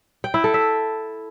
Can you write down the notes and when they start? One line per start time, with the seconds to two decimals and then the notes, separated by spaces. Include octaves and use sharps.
0.24 G5
0.34 E4
0.44 A4
0.54 E5